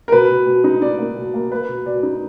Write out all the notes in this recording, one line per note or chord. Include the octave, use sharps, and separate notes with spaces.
A#4
B2 B4
B2
B2
D#4
D#4 D5
A#3
B2
A#3
A#3 B4
B2
B2 D5
D#4